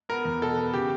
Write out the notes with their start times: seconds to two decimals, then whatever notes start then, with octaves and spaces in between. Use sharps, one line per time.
0.09 B3 A#4
0.25 E2
0.42 B2 A4
0.57 B3
0.74 C#3 G4